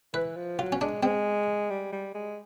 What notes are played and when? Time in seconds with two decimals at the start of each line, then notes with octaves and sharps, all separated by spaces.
0.14 E3 B4
0.36 F3
0.59 F#3 F4
0.72 C#4
0.81 G#3 D4
1.02 G#3 C4
1.70 G3
1.92 G3
2.14 G#3